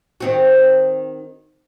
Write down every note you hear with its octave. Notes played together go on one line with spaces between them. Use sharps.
D#3 C4 F#4